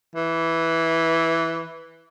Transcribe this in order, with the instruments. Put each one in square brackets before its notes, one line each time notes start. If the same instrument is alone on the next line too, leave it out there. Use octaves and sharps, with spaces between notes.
[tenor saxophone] E3